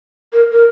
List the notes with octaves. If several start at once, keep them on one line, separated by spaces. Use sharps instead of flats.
A#4
A#4